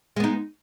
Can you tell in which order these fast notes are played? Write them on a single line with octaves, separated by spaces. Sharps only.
G#3 B3 D#4